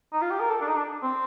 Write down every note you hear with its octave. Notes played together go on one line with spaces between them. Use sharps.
D#4
F4
G4
A#4
A4
D4
D#4
D4
C4